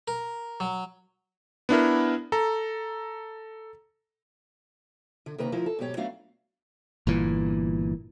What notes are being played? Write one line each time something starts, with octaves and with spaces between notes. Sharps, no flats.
A#4
F#3
B3 D4 E4 A#4
A4 A#5
D3
C3 D#3 A#3 B4 A#5
D2 F3 E4 A#4
A4
G#2 B2 F#3 G4 C#5
F#3 A3 B3 D4 F#4 F5
G1 A#2 E3